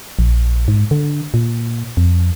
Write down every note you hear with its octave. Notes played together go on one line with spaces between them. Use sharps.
A#1
G#2
D3
A#2
F2